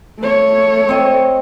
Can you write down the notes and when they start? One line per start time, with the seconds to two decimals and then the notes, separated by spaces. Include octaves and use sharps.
0.19 A3 C#5
0.89 C4 D#5